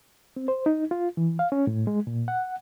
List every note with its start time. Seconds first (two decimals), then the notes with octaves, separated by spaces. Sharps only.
0.36 C4
0.48 C5
0.66 D#4
0.91 F4
1.17 E3
1.39 F5
1.52 C#4
1.67 A2
1.87 G#3
2.07 A#2
2.28 F#5